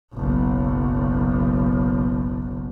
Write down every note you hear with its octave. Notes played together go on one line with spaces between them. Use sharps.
F#1 B1